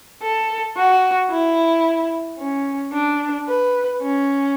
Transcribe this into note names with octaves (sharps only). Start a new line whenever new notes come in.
A4
F#4
E4
C#4
D4
B4
C#4